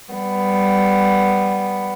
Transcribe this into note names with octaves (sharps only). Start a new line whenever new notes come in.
G3 B3